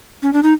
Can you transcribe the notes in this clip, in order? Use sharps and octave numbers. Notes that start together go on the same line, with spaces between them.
C#4
D4
D#4